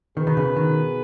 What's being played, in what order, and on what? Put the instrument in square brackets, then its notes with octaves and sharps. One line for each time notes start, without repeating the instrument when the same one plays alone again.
[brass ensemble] B2 B3 G#4 B4 [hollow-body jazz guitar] D#3
[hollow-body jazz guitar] D#3
C#3
D#3